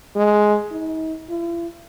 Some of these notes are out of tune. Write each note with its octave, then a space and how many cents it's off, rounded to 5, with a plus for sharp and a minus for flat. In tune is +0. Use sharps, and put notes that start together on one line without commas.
G#3 +10
D#4 +40
E4 +45